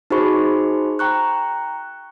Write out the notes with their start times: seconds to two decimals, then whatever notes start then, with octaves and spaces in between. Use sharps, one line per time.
0.10 D#4 F#4 G#4 C5 B5 C#6
0.99 G5 A#5 C#6 F#6